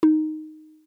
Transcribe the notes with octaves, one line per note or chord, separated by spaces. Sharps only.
D#4